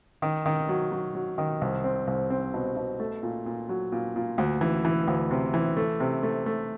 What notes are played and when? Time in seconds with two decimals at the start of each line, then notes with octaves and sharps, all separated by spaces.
0.22 D#3
0.46 D#3
0.69 F#3
0.92 F#3
1.15 F#3
1.38 D#3
1.61 C2
1.84 C4
2.07 C2
2.30 C4
2.54 B2
2.77 B2
3.00 A3
3.23 A#2
3.46 A#2
3.69 F#3
3.92 A#2
4.16 A#2
4.38 D2
4.61 E3
4.85 E3
5.08 D2
5.31 C3
5.54 E3
5.77 A3
6.00 C3
6.23 A3
6.46 A3